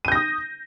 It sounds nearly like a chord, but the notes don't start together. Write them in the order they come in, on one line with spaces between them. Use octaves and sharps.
D#7 G6 A#6 D#6